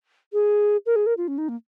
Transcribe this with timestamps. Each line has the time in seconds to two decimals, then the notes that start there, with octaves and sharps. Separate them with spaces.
0.33 G#4
0.86 A#4
0.96 G#4
1.06 A#4
1.17 F4
1.28 C#4
1.38 D#4
1.49 A#3